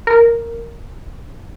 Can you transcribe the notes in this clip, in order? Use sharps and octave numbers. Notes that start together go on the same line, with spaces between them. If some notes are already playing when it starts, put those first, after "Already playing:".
A#4